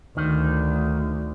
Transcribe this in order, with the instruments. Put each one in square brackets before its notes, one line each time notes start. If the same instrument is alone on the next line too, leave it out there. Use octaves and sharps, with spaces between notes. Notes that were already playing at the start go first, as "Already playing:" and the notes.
[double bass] D2 [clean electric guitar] D#3